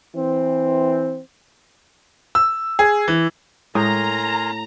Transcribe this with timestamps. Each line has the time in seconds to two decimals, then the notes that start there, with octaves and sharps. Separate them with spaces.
0.16 E3 C4
2.35 E6
2.79 G#4
3.08 E3
3.75 A2 G#3 A#4 G#5 A#5 C6